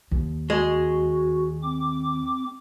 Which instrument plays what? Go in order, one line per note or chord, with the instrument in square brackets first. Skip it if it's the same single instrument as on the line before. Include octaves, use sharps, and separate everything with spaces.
[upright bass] D#2
[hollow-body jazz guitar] G#3 [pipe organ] F#4
[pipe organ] C4 D6